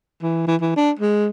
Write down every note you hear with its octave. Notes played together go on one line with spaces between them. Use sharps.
E3
E3
E3
D4
G#3